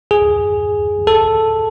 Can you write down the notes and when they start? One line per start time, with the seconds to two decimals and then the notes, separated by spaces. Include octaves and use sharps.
0.11 G#4
1.07 A4